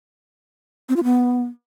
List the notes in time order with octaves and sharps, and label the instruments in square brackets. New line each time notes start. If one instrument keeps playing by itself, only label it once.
[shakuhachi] C4
F4
B3